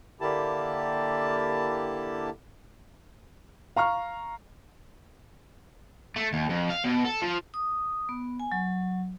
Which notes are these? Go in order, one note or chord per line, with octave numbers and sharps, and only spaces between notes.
D3 A#3 E4 G4 A5
F5 A#5 C#6 F6
A3
D#2
F2
F5
B2
A4
F3
D#6
B3
G#5
F#3